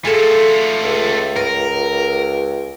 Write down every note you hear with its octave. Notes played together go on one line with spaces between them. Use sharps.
A3 F4 G#4 A4
C#2
A#4 B4